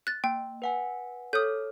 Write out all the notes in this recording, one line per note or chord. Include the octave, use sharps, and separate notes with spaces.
F#6 A6
A#3 G5
B4 F#5 G#5
A4 C#5 D#6 F6 G6